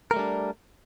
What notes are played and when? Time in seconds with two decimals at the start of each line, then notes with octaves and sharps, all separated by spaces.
0.11 A#4
0.14 A3
0.16 G3
0.19 D4